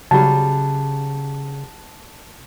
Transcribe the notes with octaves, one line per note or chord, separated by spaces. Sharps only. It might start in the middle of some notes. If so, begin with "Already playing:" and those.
C#3 F#3 G3 A5